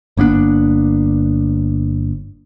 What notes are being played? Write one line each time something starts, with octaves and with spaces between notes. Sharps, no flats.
G1 A#3 B3 D4